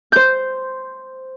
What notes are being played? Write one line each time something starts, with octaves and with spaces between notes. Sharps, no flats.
C5 G6